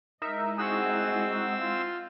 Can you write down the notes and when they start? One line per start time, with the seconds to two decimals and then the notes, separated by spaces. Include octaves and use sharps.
0.22 G#3 D#4 E4 A#4 D#5 E5
0.58 C4 D#4 F#4 G#4 F#5 E6
1.60 F4